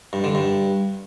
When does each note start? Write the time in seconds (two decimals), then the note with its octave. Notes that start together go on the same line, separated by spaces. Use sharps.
0.13 G2
0.24 D3
0.35 G2